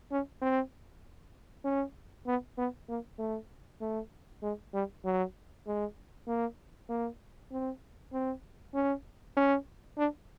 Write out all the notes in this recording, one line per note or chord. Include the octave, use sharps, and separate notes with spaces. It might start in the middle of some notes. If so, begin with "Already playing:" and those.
C#4
C4
C#4
B3
B3
A#3
A3
A3
G#3
G3
F#3
G#3
A#3
A#3
C4
C4
C#4
C#4
D4